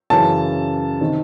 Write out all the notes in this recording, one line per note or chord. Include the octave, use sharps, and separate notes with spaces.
F#2 C#3 E3 A5
C3 D#3